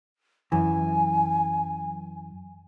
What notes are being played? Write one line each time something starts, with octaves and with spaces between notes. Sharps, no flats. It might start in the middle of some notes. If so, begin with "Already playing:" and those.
F#2 E3 G#5